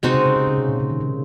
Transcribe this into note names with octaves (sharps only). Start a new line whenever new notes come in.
C3 G#3 C4 D#4 F#4
C#3
C#3
C#3
C#3
C3
A#2
C#3
D#3
C#3